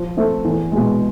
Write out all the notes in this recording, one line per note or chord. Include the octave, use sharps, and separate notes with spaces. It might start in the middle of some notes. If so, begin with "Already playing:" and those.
Already playing: F3
A3 C4
E2
B2 G#3